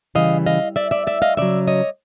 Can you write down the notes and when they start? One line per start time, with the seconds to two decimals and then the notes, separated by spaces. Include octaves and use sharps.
0.15 C#3 E3 G3 D#5 F5
0.46 D#5 F5
0.76 D5 E5
0.91 D5 E5
1.07 D5 E5
1.22 D#5 F5
1.37 C#3 F#3 D5 E5
1.68 C#5 D#5